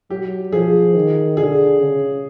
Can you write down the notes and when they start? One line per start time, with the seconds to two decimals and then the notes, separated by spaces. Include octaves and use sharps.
0.10 F#3 G4
0.52 F3 G#4
0.95 D#3
1.37 D3 G#4
1.80 C#3